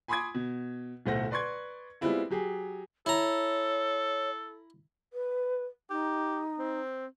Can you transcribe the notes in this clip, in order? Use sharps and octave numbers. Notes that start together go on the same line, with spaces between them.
G#5 B5 C6 D6 D#6 G#6
B2
D1 B1 A3 C5 F#5 A#6
B4 D5 C6 C#6 G#6
G3 G#3 B3 C4 E4 F4
F#3 G4 G#4
E4 A4 C#5 A#5
B4
D#4 G4
C4